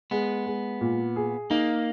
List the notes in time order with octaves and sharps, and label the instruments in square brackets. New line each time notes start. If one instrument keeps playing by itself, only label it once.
[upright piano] G#3 [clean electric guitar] B3
[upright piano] G#3
A#2
G#4
[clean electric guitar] A#3 [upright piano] D#4